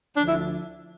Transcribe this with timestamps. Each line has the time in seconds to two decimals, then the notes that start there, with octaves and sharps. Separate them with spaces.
0.17 D2 D3 F3 D4
0.28 E4